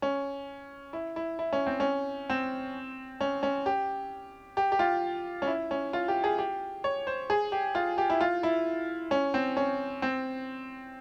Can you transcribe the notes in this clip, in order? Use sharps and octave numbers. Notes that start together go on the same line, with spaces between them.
C#4
E4
E4
E4
C#4
C4
C#4
C4
C#4
C#4
G4
G4
G4
F4
C#4
E4
C#4
F4
G4
G#4
G4
C#5
C5
G#4
G4
F4
G4
E4
F4
E4
C#4
C4
C#4
C4